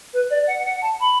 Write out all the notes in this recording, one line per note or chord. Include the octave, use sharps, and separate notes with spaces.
B4
D5
F#5
F#5
A5
B5